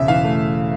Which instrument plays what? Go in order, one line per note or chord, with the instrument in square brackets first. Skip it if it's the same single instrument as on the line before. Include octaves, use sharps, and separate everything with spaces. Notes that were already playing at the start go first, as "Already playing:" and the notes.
Already playing: [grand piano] E1 C#3 E5
E3 F5
A3